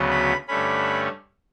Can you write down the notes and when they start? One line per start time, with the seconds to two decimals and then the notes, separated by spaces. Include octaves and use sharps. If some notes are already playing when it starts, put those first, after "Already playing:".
Already playing: D2 C#3 F#3 B3
0.10 B5
0.48 G2 D3 A3 C#4 B5